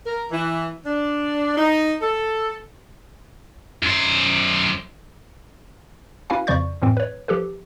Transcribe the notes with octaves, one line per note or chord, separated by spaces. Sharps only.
A#4
E3
D4
D#4
A4
F#2 C5
C#4 E4 F#4 B4 F5 G#5
F2 C#3 F3 D5 C#6 G6
F2 A2 E3 C4
B4 C#5
F3 G4 A4 B4